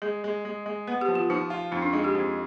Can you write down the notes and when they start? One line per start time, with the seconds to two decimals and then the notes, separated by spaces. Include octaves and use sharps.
0.02 G#3 G#4
0.24 G#3
0.45 G#3
0.66 G#3
0.87 B3 B4
1.01 G4
1.08 F3
1.15 F4
1.30 F3 D#4
1.50 F4
1.72 F2 D#4
1.82 D4
1.93 G#3 D#4
2.04 G4
2.15 F2